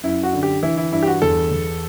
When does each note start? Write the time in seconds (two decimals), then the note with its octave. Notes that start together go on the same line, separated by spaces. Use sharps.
0.03 F#2 E4
0.23 F#4
0.33 D3
0.43 G4
0.63 E3 E4
0.77 E4
0.92 G2 E4
1.03 G4
1.07 F#4
1.22 E2 A4
1.51 E2